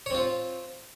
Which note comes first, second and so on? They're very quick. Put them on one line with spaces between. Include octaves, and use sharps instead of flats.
C#5 C4 F4